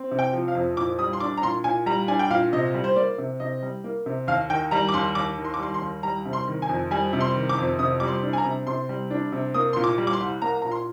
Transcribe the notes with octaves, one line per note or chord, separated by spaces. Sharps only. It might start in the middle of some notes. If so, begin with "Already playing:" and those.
Already playing: C4
C3
G5
F3
F5
F2
A#2 D6
G3 D#6
C6
D4 D6
A#5
A#2 C6
A#2 G#5
G3 A#5
D4 G#5
G5
A#2 F5
C3 D#5
G3
C5
A#3 D5
C3
C3 D#5
G3
A#3
C3
D#2 F5
D#3 G5
G3 A#5
D6
D#2 C6
D#2 D6
D#3
C6
D6
G3 C6
C6
D#2
G3 A#5
C3
C6
D#3
G#5
F2
G3 G#5
C3
C6
D#3
D6
F2
C3 D#6
G3 D6
C6
D4
G#5
A#5
C3
C3 C6
G3
D4
C3
A#3 D#6
A#2 C6
D6
G3
D6
C6
C2
A#3 A#5
A#2 A#5
C6